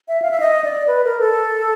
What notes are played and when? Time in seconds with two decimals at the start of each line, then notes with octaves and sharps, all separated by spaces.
0.08 E5
0.22 F5
0.31 E5
0.40 D#5
0.64 D5
0.87 B4
1.04 A#4
1.20 A4